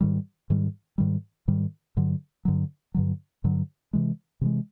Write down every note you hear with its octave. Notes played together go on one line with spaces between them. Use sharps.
G#2 D#3 G3
G#2 D#3 G3
G#2 D#3 G3
G#2 D#3 G3
G2 D3 F#3
G2 D3 F#3
G2 D3 F#3
G2 D3 F#3
C3 E3 G#3
C3 E3 G#3